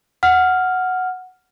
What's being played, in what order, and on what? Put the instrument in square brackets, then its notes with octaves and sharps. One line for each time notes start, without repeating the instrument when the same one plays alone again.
[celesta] F#5 F6